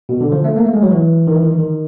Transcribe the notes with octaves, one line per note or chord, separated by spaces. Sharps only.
B2
D3
F3
A3
A#3
A3
G#3
F#3
E3
D#3
E3
D#3
E3
D#3